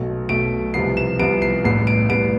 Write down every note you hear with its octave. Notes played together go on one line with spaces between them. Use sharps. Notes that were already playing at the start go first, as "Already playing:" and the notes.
Already playing: B1 B2 A3
B1 B2 A3 D7
C2 C3 F3 B3 C7
E7
C2 C3 F3 B3 D7
C7
A1 A2 G3 B3 C7
D7
A1 A2 G3 B3 D7